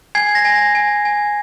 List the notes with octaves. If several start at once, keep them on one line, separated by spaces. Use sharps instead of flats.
G#5 G#6 C7
A#6
G#5
A#6
G#5
G#5